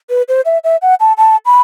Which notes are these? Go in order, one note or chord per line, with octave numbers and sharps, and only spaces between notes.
B4
C5
E5
E5
F#5
A5
A5
B5